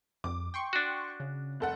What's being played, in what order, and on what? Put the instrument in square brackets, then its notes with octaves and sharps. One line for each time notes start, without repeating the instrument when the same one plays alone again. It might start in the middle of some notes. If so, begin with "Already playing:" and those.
[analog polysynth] F2 [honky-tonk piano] D6
[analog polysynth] G5 C6 C#6
[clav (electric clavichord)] D4 F#4
[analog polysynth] C#3
[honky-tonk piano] F1 A4 F#5